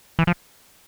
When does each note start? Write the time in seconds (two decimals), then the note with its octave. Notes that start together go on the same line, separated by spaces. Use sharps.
0.19 E3
0.27 F3